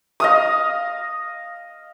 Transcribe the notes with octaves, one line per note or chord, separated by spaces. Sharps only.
D#5 F5 D#6